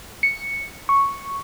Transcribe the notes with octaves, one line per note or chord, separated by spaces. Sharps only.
C#7
C#6